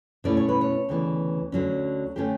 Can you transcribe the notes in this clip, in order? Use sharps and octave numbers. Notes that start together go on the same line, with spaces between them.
B2 A3 C#4 E4 D5
C#5
B4
C#5
D2 C#3 E3 B3
D2 D3 F#3 C#4
D3 A3 C#4 G4